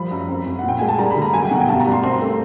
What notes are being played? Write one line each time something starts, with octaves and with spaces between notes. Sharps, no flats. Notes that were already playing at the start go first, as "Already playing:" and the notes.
Already playing: F3 G3 B5
F#2
F2
F2
A#2 F#5
G5
G#3 G#5
A5
G3 A#5
B5
D3
A#5
F#3 G#5
G5
B2 F#5
G5
G2 A5
A#5
G3
C6
C4 C6
A3